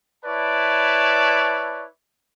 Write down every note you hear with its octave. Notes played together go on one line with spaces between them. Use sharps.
E4 B4 C#5 D5 A5